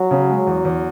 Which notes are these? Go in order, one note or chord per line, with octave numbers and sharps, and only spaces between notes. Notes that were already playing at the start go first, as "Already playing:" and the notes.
Already playing: F#3
C#3
G#3
E2
E2